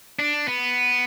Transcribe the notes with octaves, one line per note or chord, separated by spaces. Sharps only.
D4
B3